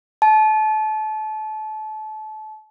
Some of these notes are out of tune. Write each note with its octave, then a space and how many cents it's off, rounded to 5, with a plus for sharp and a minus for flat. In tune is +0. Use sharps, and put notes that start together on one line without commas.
A5 -30